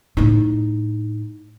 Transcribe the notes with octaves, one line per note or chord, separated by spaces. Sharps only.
A2 D#4